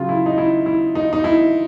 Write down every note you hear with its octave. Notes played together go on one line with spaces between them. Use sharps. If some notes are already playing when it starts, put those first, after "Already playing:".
Already playing: C#3 F#3 F4
E4
D#4
E4
E4
D#4
D#4
E4